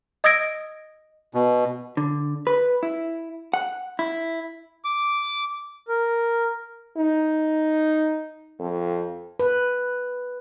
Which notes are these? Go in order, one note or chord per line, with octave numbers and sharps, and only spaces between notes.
D#5 D#6 E6 G#6 A#6 D7
B2
D3
B4
E4
F#5
E4
D6
A#4
D#4
F2
B4